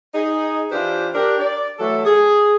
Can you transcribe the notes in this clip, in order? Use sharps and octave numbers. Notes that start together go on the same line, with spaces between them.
D#4 G#4
E3 D4 F4 G4 B4 C5
D4 G4 A#4
D5
E3 F#3 A3 A4
G#4